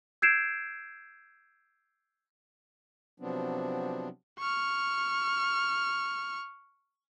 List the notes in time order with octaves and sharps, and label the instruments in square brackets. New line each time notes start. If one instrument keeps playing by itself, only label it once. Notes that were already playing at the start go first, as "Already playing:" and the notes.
[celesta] E6 G6 G#6 C7 D7 E7
[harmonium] C3 F3 F#3 B3 C4 D4
[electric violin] C#6 F6